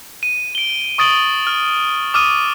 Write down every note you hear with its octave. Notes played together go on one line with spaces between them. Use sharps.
D#7
D7 G7
C#6 D#6 A6 D7 F#7 G7
F6
D6 D#6 F6 D#7